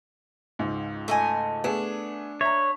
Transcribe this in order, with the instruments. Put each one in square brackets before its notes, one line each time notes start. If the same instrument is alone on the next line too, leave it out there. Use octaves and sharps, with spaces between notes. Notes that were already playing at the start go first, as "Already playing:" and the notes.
[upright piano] C#2 G#2
[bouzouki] A3 D#5 G#5
[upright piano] A3 B3 G#4 [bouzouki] D4
[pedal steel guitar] C#5 [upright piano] E5 A#5